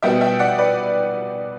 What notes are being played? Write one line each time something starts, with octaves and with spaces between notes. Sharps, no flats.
B2 G3 B3 E5 G5
E5 G5
D5 F#5
B4 D5